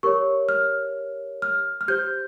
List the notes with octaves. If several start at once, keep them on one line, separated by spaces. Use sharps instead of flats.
G4 A#4 C#5 C#6
F6
F6
F6
G4 C5 G6